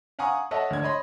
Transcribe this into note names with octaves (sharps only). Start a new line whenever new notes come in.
F5 F#5 G#5 A#5 C#6 D#6
A4 C#5 D#5 E5 F#5 A5
D2 D4 G#6
C#5 D#5 B5 C6